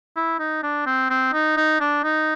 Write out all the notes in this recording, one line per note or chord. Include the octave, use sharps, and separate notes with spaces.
E4
D#4
D4
C4
C4
D#4
D#4
D4
D#4